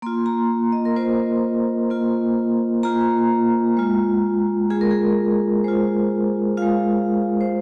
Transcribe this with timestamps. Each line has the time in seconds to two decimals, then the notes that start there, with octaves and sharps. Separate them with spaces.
0.02 A#3 F4 C6
0.26 A#5
0.72 D#5
0.85 A#4
0.96 A#3 F4 C5
1.90 A#3 F4
2.83 A#3 F4 A#5
3.77 G#3 F4
4.70 G#3 F4 G#4
4.81 A#4
4.91 G#4
5.64 G#3 F4 C5
6.57 G#3 F4 F5
7.41 C5